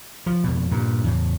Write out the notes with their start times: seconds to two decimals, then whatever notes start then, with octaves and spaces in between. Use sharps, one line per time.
0.26 F3
0.44 F2 B2
0.71 G2 A#2
1.04 E2 A2